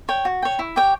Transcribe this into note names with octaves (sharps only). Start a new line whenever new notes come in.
C#5 G5
F#4
C#5 G5
E4
G4 C#5 G5